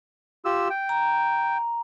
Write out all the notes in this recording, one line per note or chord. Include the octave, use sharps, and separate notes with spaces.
F4 G4 E6
G5
A#5